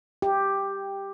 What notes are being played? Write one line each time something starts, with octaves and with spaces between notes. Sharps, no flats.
G4